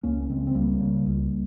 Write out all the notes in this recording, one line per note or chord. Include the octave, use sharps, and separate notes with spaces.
C#2 A#3 C#4
C#3 G#3 C4
C4
C#2 G3 A#3
C#3
C#2